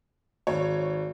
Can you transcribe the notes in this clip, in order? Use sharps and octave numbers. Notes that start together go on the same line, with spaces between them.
G#1 C#5